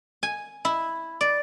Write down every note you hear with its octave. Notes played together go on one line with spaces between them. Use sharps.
G#5
E4
D5